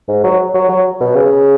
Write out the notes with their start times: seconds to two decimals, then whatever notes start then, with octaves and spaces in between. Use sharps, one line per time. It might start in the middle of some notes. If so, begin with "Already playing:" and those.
0.08 G#2
0.24 F#3
0.54 F#3
0.69 F#3
1.00 B2
1.15 C#3